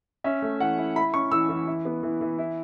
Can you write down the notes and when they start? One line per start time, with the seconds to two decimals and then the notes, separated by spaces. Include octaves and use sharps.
0.24 C#4 E5
0.42 A3
0.60 E3 F#5
0.78 E4
0.96 E4 B5
1.14 C#4 C#6
1.32 E3 E6
1.49 E3
1.67 E4
1.85 B3
2.03 E3
2.21 E3
2.38 E4